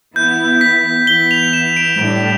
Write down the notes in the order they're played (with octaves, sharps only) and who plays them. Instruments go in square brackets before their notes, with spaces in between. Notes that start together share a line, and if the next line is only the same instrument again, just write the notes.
[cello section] E3 B3 E4 [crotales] G6
[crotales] B6
[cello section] E3 B3 E4 [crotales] G7
[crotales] F7
E7
D7
[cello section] A2 G3 D4 [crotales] D7